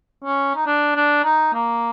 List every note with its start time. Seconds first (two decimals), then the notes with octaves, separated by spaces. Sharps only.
0.24 C#4
0.55 D#4
0.67 D4
0.95 D4
1.24 D#4
1.54 A#3